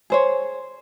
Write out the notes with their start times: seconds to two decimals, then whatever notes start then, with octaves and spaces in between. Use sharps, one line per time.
0.10 G#4 C5 C#5